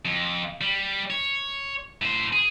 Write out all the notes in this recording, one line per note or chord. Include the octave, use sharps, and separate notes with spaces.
F2
G3
C#5
A2 C5
G#4